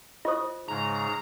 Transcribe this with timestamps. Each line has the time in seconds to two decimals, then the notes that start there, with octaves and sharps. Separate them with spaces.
0.25 F4 C5 D#5 C#6 D#6
0.68 G#2 C#3 G#3 A#5